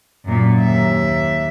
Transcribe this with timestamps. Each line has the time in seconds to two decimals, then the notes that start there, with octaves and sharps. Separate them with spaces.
0.25 F#2 A#2
0.60 D#2 E5